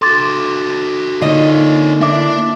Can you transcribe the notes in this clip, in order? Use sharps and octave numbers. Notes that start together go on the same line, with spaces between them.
F#4 A4 C6 D6 A6
D3 A#3 D4 D#4 F4 C#5 D#5
A#3 D4 E4 E5 D6